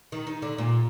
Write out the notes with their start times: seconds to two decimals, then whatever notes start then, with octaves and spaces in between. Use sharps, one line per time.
0.12 D#3
0.27 D#4
0.42 D3
0.58 A#2